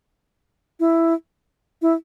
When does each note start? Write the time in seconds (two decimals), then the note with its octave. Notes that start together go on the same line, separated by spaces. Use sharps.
0.80 E4
1.82 E4